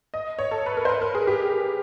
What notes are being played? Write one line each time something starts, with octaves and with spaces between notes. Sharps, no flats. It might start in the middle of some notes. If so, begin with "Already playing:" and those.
D#5
C#5
A4
B4
A#4
C5
B4
A#4
G#4
G4